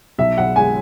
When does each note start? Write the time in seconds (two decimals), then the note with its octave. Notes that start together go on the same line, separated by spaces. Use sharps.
0.18 B1 E5
0.37 B1 F#5
0.56 G#3 G#5